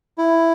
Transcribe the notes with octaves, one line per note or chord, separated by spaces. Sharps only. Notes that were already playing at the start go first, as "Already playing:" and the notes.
E4